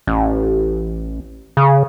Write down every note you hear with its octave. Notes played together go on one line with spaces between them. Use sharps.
A1
C#3